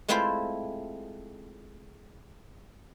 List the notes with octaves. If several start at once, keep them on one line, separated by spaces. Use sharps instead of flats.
G#3 A3 C4 E4 F4 C5